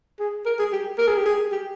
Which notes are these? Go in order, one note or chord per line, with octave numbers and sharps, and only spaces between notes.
G#4
A#4
G#4
G4
A#4
G#4
G4
G#4
G4